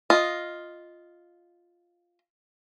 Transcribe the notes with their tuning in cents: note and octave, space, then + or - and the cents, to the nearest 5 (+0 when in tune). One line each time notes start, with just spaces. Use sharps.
F4 +0 D#5 +0